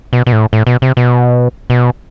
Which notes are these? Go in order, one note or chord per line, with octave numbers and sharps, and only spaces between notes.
B2
B2
A2
A2
B2
C3
B2
B2